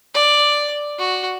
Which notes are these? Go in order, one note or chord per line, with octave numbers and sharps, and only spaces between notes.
D5
F#4